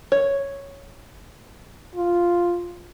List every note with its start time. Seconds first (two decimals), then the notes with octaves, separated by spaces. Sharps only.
0.12 C#5
1.95 F4